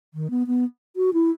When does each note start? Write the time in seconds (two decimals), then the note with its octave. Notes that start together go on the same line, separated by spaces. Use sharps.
0.14 D#3
0.30 B3
0.47 B3
0.96 F#4
1.13 E4